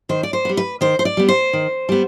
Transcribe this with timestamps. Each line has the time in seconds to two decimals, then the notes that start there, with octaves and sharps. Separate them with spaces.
0.09 D#3 C5
0.23 D5
0.33 C5
0.45 G3 B3
0.57 B4
0.81 D#3 C5
0.99 C5
1.05 D5
1.17 G3 B3
1.28 C5
1.53 D#3
1.89 G3 B3